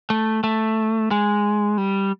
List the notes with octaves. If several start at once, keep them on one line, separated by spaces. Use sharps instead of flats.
A3
A3
G#3
G3